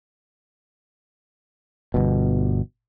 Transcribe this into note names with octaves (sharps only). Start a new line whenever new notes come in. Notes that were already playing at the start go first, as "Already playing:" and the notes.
G1 B2